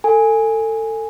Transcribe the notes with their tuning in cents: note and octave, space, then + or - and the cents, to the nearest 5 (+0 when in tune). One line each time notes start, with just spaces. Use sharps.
A4 +25 G#5 +0